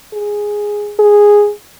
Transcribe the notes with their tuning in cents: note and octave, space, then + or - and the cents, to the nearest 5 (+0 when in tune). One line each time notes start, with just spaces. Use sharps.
G#4 -5
G#4 -5